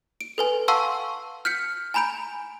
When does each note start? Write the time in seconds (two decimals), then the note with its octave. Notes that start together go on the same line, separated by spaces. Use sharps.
0.21 D7
0.38 A4 B4 G#5
0.68 F5 F#5 A5 C6 C#6 E6
1.45 F6 G6 B6 C#7
1.94 G#5 A#5 B5 G6 D7